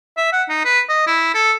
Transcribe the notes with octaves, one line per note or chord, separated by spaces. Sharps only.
E5
F#5
D#4
B4
D#5
E4
A4